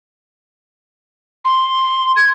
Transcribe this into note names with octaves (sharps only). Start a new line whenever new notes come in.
C6
G#6